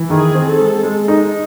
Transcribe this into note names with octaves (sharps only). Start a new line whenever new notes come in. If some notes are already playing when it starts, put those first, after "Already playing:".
Already playing: E3
D#3 G#4
C4
A4
G#3
G#3
D#4